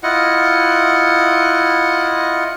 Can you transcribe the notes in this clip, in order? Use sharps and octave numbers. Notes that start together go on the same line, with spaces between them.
E4 F4 D#5 F#5